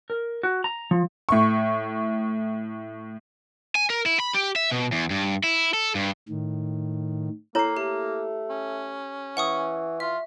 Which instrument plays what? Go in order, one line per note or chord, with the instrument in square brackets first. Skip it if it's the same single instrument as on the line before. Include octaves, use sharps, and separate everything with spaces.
[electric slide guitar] A#4
F#4
A#5
F3
[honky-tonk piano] A2 C#6
[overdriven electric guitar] G#5
A#4
E4
B5
G4
E5
B2
E2
G2
E4
A4
G2
[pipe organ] A2 D#3
[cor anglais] A#3 [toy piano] E4 C#5 A#5 [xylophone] A4 C7
[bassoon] A3 [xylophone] G4
[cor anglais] C#4
[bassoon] E3 [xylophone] F#5 C#6 D#6
[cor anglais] F4 [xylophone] E5